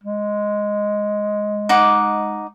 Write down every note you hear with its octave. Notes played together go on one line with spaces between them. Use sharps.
G#3
D#4 F#5 D6